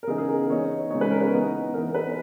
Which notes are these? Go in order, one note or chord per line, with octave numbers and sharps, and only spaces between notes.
A#4
C#3 E3 B3 D#4 G#4
G#4
A#4
E3 B3 D#4 C#5
C#3 G#3 B3 D#4 C#5
B4
A#4
B4
E3 B3 D#4
E3 B3 D#4 A#4
B4